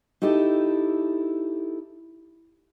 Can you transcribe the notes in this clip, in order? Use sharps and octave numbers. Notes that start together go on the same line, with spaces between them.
D#4 E4 G4 A4